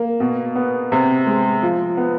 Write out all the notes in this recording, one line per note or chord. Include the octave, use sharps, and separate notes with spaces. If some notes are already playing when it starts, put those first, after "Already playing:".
Already playing: A#3
B2
B3
C3
G#3
F3
B3